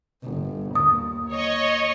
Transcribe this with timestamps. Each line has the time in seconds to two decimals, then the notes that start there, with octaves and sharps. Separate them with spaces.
0.23 G1
0.75 D#2 D#6
1.31 C#5 D#5 C#6